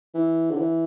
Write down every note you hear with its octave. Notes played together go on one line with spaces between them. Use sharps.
E3
D3
E3